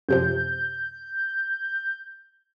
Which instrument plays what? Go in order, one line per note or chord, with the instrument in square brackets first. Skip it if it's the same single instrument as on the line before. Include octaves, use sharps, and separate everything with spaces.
[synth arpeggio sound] F#2 C3 F3 [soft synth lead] G6